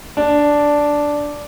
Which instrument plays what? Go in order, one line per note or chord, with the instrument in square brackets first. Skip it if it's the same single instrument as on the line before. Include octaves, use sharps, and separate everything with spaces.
[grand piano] D4